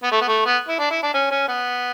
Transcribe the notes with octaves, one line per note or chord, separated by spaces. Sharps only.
B3
A3
B3
A3
B3
E4
D4
E4
D4
C#4
C#4
B3